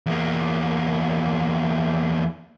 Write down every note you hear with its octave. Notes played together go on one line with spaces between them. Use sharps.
E2 A#3